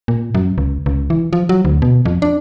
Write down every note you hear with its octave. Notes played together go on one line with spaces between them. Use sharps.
A#2
F#2
C#2
C#2
E3
F3
F#3
D2
B2
F2
D4